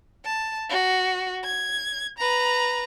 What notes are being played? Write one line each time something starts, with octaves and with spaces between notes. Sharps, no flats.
A5
F#4
G#6
B4 A#5